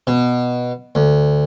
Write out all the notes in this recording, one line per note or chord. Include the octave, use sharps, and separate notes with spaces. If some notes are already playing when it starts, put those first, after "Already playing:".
B2
D2